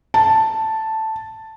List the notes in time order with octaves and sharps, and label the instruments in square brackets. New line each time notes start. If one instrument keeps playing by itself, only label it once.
[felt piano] A5